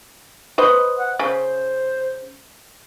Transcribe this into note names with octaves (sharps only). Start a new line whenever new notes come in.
B4 C5 D#5
F#5
C#3 C5